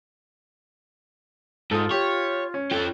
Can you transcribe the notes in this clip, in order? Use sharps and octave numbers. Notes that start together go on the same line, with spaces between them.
G#2 F4 A4 D#6
G4 C#5
C#4
F4 A4 G5